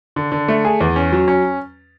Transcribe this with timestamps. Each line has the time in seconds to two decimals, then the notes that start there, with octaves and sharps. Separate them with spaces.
0.16 D3
0.32 D3
0.48 A3
0.65 G#4
0.80 E2
0.96 C#4
1.12 F#3
1.28 C#4